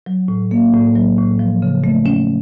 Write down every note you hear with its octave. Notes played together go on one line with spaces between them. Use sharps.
F#3
A2
A#3
A2
F#3
A2
F3
C#3
A3
C#4